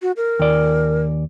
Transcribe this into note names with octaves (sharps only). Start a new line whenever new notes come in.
F#4
A#4
D#2 D5